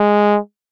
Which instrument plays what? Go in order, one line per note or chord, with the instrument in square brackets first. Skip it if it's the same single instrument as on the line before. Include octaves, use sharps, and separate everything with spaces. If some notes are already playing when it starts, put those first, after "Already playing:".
Already playing: [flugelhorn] G#3